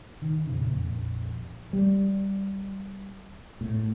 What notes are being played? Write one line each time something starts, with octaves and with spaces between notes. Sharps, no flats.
D#3
F2 A#2 C#3
A#1 F2
G3
A2